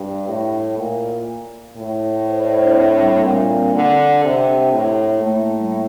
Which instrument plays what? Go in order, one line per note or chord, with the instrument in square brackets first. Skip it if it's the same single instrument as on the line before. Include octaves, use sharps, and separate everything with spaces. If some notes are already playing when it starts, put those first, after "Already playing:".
Already playing: [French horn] G2
A2
A#2
A2
[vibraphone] C5
D5
C5
E4
D4
C4
D4
G3
C4
A#3
[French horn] A#2 [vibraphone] D4
[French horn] D3
C3
A2
[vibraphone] A#3
[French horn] A2 [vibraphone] A3
[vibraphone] A3
A3
G3
A3